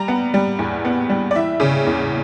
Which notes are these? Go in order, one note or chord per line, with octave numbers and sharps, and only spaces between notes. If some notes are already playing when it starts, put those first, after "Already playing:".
Already playing: G3 A#5
B3
G3
E2
B3
G3
D5
E3 E5
C#3
E2